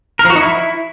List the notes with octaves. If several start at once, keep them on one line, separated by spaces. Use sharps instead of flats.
A#4
F3
F#4
D#4
E4